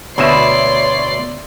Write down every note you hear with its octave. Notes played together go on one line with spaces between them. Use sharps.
D2 B2 E4 C#5 D5 E5 C6